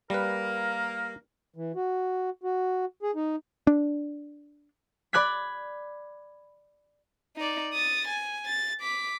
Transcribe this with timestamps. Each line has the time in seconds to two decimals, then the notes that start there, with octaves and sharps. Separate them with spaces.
0.10 G3 A#3 A#4 B4
1.56 E3
1.75 F#4
2.43 F#4
3.03 G#4
3.15 D#4
3.67 D4
5.13 D5 B5 F#6 G#6 B6
7.36 D#4 D5
7.73 D#6 A6
8.07 G#5
8.45 A6
8.81 D6 B6